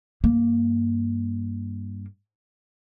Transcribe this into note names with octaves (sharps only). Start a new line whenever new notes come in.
G2 A#3